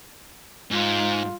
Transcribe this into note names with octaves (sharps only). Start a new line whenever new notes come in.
G#2 F4